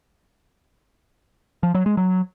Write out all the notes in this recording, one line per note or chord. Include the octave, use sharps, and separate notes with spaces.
F3
F#3
G#3
F#3